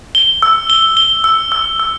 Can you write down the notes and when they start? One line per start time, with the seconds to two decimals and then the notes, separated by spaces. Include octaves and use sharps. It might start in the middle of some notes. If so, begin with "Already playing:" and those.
0.15 G7
0.42 E6
0.70 G7
0.97 G7
1.24 E6
1.52 E6
1.80 E6